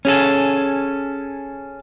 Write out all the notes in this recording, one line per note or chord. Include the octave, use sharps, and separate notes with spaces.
C#4 G#4 A4